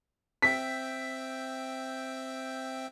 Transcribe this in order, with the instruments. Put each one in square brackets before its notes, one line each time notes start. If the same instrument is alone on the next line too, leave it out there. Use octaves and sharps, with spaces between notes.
[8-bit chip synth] C4 E5 G5 [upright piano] B6